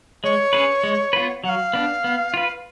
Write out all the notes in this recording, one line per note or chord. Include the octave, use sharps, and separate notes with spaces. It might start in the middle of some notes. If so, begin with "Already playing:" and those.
G#3 C#5
C#4 G#4 B4
G#3
B3 F4 B4
F#3 F#5
F5
B3 D4
B3
F4 B4